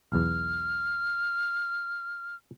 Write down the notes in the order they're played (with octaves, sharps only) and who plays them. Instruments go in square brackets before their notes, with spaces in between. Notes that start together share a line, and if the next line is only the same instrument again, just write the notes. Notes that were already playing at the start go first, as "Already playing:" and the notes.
[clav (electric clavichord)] B1 E2 [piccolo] F6